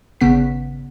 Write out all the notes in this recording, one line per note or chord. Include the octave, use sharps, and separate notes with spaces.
G#1 C#3 B3 F#5 B6